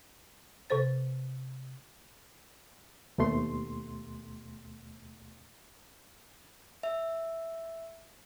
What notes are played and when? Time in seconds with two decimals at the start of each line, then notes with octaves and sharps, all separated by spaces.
0.70 C3 A4 C5 A6
3.18 D#2 B2 A3 C6
6.83 E5